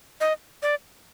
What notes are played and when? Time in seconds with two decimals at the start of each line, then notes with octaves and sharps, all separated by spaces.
0.21 D#5
0.62 D5